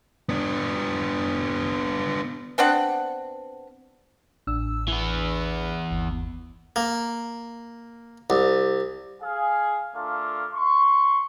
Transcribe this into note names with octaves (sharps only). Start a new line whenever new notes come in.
B3 D4
B3 C4 D4 F#5
A1 D4 E6
E3 B3
G1 D#2
A#3
C2
G#4 F5
A3 D4 F4 A#4 F5
C6 C#6